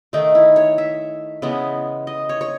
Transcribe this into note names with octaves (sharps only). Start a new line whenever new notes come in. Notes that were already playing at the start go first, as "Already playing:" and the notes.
D#3 A3 D#4
E4
C#5
E5
C#3 E3 G#3 B3
D#5
C#5
C#5